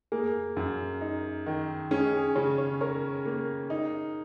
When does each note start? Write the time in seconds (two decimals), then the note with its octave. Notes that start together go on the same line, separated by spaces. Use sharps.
0.12 A#3 G#4
0.57 F#2
1.01 D#4
1.46 D#3
1.91 C#4 G#4
2.14 G#4
2.35 C#3 C#5
2.58 C#5
2.81 A#4 C#5
3.25 A#3
3.70 D#4